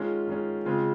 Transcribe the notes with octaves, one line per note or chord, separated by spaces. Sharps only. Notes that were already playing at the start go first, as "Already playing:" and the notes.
Already playing: D#3 G#3 C#4 F4
D#3 G#3 C#4
C#3 G#3 C4 F4